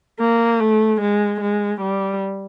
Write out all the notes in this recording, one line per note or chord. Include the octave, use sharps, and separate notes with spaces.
A#3
A3
G#3
G#3
G3